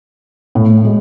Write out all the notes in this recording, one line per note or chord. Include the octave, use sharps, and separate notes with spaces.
A2
G#3